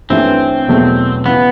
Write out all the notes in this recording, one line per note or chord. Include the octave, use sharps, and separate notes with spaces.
G2 E3 A3 C4 C#4 E4
E2 B2 F#3 A3
C#3 E3 B3